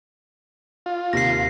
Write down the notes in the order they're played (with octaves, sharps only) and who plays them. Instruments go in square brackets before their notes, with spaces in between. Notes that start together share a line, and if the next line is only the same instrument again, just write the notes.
[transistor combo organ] F4
[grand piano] D#2 C3 [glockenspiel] A#6 C7